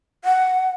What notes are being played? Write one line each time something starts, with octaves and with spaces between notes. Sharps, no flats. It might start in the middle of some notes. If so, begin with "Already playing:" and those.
F#5